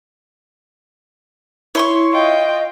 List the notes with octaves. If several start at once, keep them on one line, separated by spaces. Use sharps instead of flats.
E4 C#5 C6 C#6
F4 D#5 G5